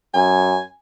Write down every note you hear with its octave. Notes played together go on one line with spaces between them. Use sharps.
F#2 G#5